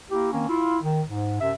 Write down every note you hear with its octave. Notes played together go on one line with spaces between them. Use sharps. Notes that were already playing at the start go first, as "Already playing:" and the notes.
A#3 E4 G4
D#3 A#3 C4 C#4
E4 F4
D#3
G#2
F#2 C3 E5